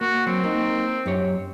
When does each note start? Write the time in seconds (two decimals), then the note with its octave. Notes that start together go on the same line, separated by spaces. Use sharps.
0.01 A#3 F#4
0.27 F#3 C4
0.44 A#3 D#4
1.06 F#2 G4 C#5